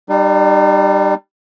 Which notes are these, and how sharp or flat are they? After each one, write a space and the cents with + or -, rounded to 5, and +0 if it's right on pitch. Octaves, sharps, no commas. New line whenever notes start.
G3 +0 D#4 -45